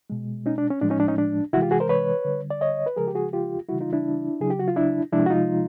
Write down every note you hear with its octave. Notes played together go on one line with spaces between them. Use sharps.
B2 G#3
C#4 D#4
D4
C#4
A2 F3 G#3 D4
C#4 D#4
D4
C#4 D#4
D4
C3 E3 G#3 E4 F#4
F4 G4
F#4 G#4
A#4 C5
B4 C#5
D3 G3
D5
C#5 D#5
B4
C#3 F3 G#3 G#4 A#4
G4
F#4 G#4
F4 G4
C#3 E3 G3 E4 F#4
D#4 F4
D4 E4
C#3 F#3 G#4
G4
F#4
F4
D4 E4
C3 F3 G#3 D4 E4
F#4
D#4 F4